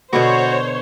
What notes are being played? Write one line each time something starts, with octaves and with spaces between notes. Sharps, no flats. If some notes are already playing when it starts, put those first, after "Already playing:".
B2 D3 B3 F#4 C5 C#5